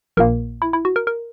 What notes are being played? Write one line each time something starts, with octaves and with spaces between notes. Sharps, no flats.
A#1 A#2 A#3 A#4
E4
E4
F#4
A#4
A#4